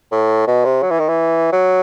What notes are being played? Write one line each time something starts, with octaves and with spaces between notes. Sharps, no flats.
A2
B2
C3
F#3
E3
D#3
E3
F#3